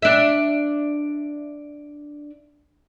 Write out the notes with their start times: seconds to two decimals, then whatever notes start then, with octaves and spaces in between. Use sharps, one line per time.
0.02 D4 E5